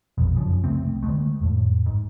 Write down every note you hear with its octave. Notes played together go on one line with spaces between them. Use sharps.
A#1 F2 B2
F#2 C#3 F3
C2 A2 A3 C4
D3 F3 G#3 A3
F2 A2
G#2